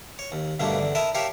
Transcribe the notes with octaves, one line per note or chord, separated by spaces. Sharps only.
C#5
D#2
G2 B2 D3 A3 A#3 D4
E2 D3
E4 A#4 D#5 E5 A5 A#5
G4 A#4 C#5 E5 F5 A5